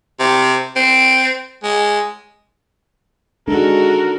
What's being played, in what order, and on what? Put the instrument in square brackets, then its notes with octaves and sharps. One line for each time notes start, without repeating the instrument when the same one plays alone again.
[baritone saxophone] C3
C4
G#3
[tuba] G#3 [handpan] D4 D#4 [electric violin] F#4 A4 [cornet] A#4